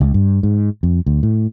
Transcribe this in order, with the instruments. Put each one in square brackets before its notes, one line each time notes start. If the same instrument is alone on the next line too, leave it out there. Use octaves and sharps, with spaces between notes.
[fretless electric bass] C#2
G2
G#2
F2
D2
A2